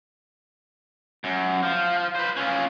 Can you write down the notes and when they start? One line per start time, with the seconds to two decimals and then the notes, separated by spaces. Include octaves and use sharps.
1.24 F#2
1.63 F3
2.15 B4 C5
2.37 C#4 F4